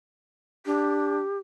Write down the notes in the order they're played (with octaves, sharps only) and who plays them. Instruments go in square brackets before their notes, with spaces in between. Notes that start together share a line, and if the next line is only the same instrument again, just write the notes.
[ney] D4 [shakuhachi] G4